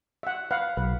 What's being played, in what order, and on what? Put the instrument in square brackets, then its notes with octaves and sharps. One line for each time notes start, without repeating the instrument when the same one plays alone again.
[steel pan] E5 F#5
B4 F5 F#5
[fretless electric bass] B1 [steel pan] B4